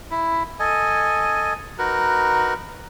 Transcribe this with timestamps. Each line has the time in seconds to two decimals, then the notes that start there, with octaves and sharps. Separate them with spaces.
0.11 E4
0.60 A4 D#5 G#5
1.79 D#4 F#4 A#4 B4